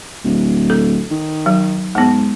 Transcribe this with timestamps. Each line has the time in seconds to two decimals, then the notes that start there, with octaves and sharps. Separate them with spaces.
0.24 D1
0.70 A4
1.11 D#3
1.46 F#3
1.95 G#2 G#3 B3